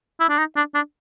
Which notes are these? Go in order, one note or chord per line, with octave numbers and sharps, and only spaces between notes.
E4
D4
D#4
D4
D4